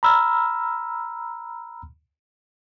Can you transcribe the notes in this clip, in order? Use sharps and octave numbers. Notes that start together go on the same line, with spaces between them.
A#5 B5 E6 F6